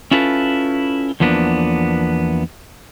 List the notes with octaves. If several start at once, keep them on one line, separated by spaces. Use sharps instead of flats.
C#4 E4 F4 A4 B4
E2 F3 A#3 B3 C#4 D4